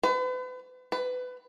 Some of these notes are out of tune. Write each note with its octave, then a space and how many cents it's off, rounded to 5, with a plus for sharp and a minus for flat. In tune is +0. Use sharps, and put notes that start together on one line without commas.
B4 +40
B4 +25